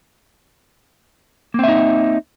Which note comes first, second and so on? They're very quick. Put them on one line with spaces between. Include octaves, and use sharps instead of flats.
A#3 C4 E5 D#4